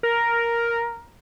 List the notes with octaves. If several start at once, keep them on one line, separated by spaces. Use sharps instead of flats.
A#4